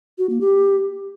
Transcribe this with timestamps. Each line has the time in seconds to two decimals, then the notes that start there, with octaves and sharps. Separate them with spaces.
0.18 F#4
0.30 A#3
0.41 G4